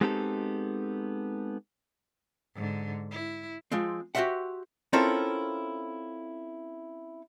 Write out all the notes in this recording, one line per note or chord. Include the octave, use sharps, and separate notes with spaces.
G#3 B3 C4 D#4 G4 A4
G#2 D3
E4
F3 G#3 C4
F#4 G4 A#4 C5 E5 F#5
C4 C#4 E4 F4 A4 A#4